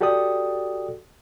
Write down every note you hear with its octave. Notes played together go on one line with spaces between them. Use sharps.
F#4 G4 A4 D5 G5 D#6